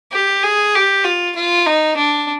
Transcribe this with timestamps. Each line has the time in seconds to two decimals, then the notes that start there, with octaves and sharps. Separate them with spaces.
0.12 G4
0.43 G#4
0.74 G4
1.04 F4
1.35 F4
1.66 D#4
1.97 D4